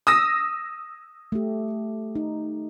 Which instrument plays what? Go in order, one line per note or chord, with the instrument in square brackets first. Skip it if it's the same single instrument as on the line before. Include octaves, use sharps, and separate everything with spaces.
[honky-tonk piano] D#6 E6 A#6
[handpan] A3 G4
D#4